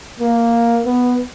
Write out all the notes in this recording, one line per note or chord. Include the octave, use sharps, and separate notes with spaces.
A#3
B3